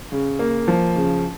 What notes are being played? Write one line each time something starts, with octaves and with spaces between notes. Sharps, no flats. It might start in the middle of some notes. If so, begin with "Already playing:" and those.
C#3
A#3
F3
C#3